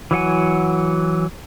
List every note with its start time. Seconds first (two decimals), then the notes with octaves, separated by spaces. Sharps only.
0.11 E3 F#3 F#5 G#5